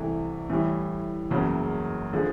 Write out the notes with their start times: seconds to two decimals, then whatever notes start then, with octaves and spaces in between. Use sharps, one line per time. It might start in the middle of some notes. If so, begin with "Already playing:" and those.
Already playing: C2 C3 E3 A3
0.49 A2 E3 G3
1.31 F#1 E2 C#3 F#3
2.13 D3 F3 G#3